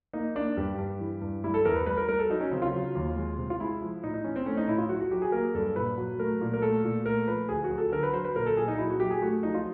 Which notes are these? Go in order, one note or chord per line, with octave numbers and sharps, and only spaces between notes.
A#3 D#4
A#3 D4
G2 G4
G2
E3
G2
G3 E4
A4
E2 A#4
B4
G3 B4
A#4
G3 A#4
A4
F#3 D#4
C#4
C#3 C4
F4
F#3
D#2
G#3
C3
F4
G#3 E4
F3
A2 D#4
D#4
E3 C#4
C4
A3 C#4
D#4
A2 E4
F4
F#3 F#4
F#4
F#3 G4
G#4
A#3 A#4
G2 A4
A#2 B4
F#3
A3 A#4
A#2
A#4
A3 A4
A#2
A3 A#4
F3 B4
D2 G#4
F#4
F#3
A4
D3 A#4
B4
F#3 C5
B4
A#2 A#4
A4
A#2 G#4
D#4
F#3 E4
F#4
F#3 G4
G#4
A3 F#4
F3 D#4
F4